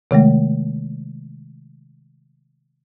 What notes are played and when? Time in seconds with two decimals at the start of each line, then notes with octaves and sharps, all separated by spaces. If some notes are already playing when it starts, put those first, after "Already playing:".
0.11 C3 D#3 G#3 A3